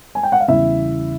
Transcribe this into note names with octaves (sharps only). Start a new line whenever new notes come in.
G#5
G5
F#5
F5
E2 C#3 E3 G3 E4 E5